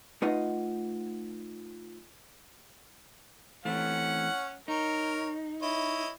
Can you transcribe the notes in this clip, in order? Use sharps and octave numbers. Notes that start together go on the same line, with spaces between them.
A3 D#4 F4 B4 D#5 F#5
E3 A3 C4 C#4 F#5
D#4 A#4 C#5
E4 C#5 D#5